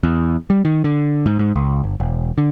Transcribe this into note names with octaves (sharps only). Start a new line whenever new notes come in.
E2
G3
D#3
D3
G#2
G#2
C#2
G1
E1
D3